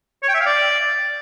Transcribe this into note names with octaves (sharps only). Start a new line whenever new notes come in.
C#5
G5
E5
F5
D5